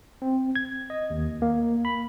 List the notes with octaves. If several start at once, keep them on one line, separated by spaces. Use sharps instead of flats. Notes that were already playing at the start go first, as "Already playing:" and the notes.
C4
G#6
D#5
D#2
A#3
B5